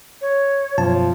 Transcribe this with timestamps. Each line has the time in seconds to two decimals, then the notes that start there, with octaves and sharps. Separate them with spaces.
0.21 C#5
0.78 F#2 B2 F3 A5